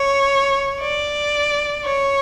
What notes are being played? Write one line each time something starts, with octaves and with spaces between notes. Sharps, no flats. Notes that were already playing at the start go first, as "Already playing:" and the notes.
Already playing: C#5
D5
C#5